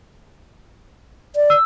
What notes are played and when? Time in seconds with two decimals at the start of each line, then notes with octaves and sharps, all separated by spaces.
1.36 D5
1.50 E6